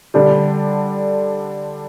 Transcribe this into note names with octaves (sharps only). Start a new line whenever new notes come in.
D3 G3 D4